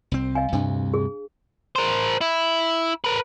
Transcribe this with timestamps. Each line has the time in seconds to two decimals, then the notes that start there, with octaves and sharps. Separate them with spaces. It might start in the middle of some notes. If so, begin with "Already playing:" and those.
0.11 C2 C4
0.35 D#5 F5 G#5
0.53 D2 G2 C3 D4
0.94 G#4
1.76 A#4 C5
2.21 E4
3.04 A#4 B4